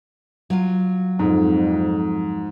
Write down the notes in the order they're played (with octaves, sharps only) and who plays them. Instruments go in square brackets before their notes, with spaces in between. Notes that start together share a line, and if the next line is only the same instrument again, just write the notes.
[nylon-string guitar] F#3 F4
[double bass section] F2 [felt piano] G#2